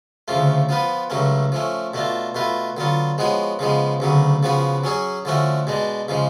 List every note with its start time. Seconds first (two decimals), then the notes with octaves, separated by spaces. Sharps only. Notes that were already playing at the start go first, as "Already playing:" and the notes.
0.28 D2 C#3 F3 A3 F4
0.69 F3 B3 F4 B4
1.10 C#2 C#3 F#3 A3 C#4
1.52 F3 A3 C#4
1.94 B2 A3 D4 F4
2.35 B2 A3 F4 B4
2.77 D3 F#3 B3 F4
3.18 F3 G#3 B3 F#4 C#5
3.59 C#3 F3 G#3 B3
4.00 D2 C#3 F#3 B3
4.43 C#3 F3 B3 F#4
4.84 F#3 C#4 G#4 C#5
5.25 D3 F3 A3 C#4 F#4
5.67 B2 G#3 D4
6.08 C#3 F3 G#3